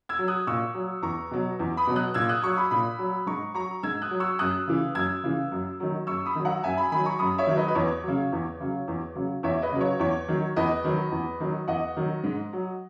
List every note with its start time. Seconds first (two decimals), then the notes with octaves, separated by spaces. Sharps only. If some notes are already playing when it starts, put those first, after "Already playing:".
0.09 E6 G#6
0.19 F#3
0.28 D#6 F#6
0.47 A#2 C#6 E6
0.74 F#3
1.02 E2 A#5 C#6
1.31 B2 F#3
1.59 E2
1.77 B5 D#6
1.87 B2 F#3
1.96 D#6 F#6
2.14 A#2 E6 G#6
2.29 D#6 F#6
2.42 F#3 C#6 E6
2.57 B5 D#6
2.71 A#2 B5 D#6
2.99 F#3
3.27 G#2 A#5 C#6
3.54 F#3 A#5 C#6
3.83 G#2 E6 G#6
4.02 D#6 F#6
4.11 F#3
4.20 C#6 E6
4.39 F#2 D#6 F#6
4.68 C#3 E3
4.95 F#2 E6 G#6
5.24 C#3 E3
5.52 F#2
5.80 D#3 F#3
6.07 F#2 C#6 E6
6.26 B5 D#6
6.35 D#3 F#3
6.45 F#5 A#5
6.63 F#2 E5 G#5
6.77 G#5 B5
6.91 D#3 F#3 G#5 B5
7.05 A#5 C#6
7.19 F#2 B5 D#6
7.38 C#5 E5
7.47 D#3 F#3
7.57 B4 D#5
7.68 B4
7.75 E2 C#5
8.03 C#3 F#3
8.32 E2
8.60 C#3 F#3
8.88 E2
9.15 C#3 F#3
9.43 E2 C#5 E5
9.62 B4 D#5
9.72 C#3 F#3
9.81 C#5
9.99 E2 C#5
10.28 D#3 F#3
10.56 E2 B4 D#5
10.84 D#3 F#3
11.11 E2
11.40 D#3 F#3
11.68 E2 D#5 F#5
11.97 D#3 F#3
12.24 G#2
12.53 F#3